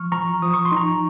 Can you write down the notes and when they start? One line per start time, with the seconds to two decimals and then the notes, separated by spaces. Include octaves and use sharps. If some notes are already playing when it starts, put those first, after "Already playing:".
Already playing: F3 C#6 F6
0.12 F3 A#5 C#6
0.42 F3 D#6
0.54 C#6
0.65 C6
0.72 D#4
0.77 A#5 C#6